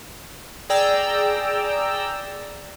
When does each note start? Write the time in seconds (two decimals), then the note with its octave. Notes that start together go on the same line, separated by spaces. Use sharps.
0.69 G#4 D5 G5 A#5 E6